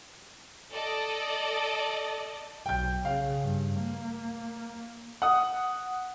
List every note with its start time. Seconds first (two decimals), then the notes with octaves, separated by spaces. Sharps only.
0.72 A4 D5 D#5
2.66 B1 G5 G6
3.05 C#3 F5
3.41 G2
3.76 A#3
5.22 F#5 D#6